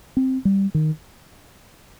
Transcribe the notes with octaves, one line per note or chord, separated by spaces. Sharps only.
C4
G3
D#3